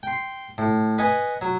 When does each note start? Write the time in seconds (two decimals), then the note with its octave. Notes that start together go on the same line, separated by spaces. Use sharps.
0.03 G5 C6
0.58 A2
0.98 B4 D#5 F#5 G#5
1.41 F#3